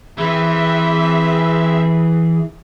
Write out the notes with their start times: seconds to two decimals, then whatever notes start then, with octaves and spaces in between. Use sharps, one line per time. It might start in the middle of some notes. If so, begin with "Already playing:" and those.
0.18 E3 C4 G#4 E5 B5 E6